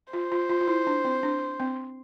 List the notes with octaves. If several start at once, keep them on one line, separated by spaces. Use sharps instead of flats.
F4 C5
F4
F4
F4
E4
D4
C4
D4
C4